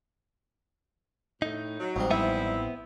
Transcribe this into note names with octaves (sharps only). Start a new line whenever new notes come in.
A2 D#4
F#3
A1 F2 G#2 G3
B3 C4 E4 E5